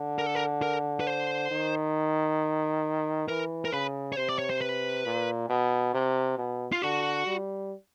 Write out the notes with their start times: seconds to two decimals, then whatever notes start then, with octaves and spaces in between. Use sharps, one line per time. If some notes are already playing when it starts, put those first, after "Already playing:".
Already playing: D3
0.18 A#4
0.26 A4
0.35 A#4
0.62 A#4
1.00 B4
1.07 C5
1.51 D#3
3.28 E3 A#4
3.65 A#4
3.72 C#3 B4
4.12 C#5
4.17 C3 C5
4.29 D5
4.39 C#5
4.50 C5
4.61 B4
5.06 A#2
5.49 B2
5.94 C3
6.38 B2
6.72 F4
6.82 D3 F#4
7.27 G3